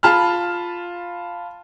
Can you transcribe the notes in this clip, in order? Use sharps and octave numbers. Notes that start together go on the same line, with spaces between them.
F4 A5 B5 F6